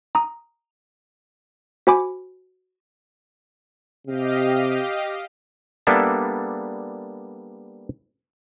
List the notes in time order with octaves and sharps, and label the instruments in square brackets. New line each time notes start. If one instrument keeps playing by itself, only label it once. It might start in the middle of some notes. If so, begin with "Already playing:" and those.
[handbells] A#5 D#6
F#4 C5 G#5 B5 D6
[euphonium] C3 [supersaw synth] G4 D#5 F5
[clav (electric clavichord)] G3 A#3 B3 D4 A4 E5